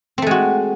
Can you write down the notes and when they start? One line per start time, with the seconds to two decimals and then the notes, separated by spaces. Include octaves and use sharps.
0.18 C4
0.22 A3
0.27 G#3
0.31 F#4